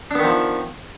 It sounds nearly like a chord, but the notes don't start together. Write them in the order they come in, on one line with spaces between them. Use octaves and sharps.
D4 B3 D#3 F3